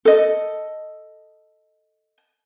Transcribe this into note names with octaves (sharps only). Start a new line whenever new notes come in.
A4 D#5